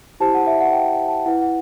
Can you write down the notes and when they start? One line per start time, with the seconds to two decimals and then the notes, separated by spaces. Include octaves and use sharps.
0.20 E4 G4 C5 A5
0.34 F#5
0.47 E5
0.60 F#5
0.73 G5
1.08 A5
1.25 E4 B4 F#5
1.41 F#5